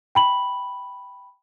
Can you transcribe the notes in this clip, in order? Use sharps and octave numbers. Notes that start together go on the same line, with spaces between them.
G5 B5 F#7